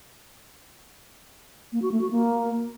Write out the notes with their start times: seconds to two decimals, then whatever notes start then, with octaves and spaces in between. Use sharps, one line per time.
1.72 A#3
1.82 F#4
1.92 A3
2.01 F#4
2.11 A#3